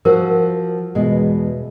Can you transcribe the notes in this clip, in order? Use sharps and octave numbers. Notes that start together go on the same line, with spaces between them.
F3 F#4 A#4 C5
E2 B2 G#3